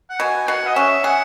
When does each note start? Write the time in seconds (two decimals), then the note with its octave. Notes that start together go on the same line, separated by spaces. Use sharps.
0.10 F#5
0.20 B2 G#5
0.48 B2 F#5
0.66 D#5
0.76 C#4 E5
1.04 G#4 F#5